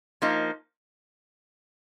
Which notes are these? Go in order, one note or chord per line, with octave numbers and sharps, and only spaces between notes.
F3 A#3 D#4